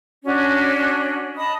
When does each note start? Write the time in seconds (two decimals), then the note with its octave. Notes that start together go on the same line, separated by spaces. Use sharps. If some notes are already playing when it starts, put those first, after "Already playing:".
0.24 C#4 D4 F#4
1.36 D#5 A5 B5 D#6